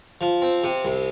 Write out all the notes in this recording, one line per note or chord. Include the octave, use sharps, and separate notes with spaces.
F3
C4
C3
C2